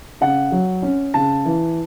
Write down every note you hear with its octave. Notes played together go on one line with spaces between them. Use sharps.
C#3 F#5
F#3
C#4
C#3 A5
E3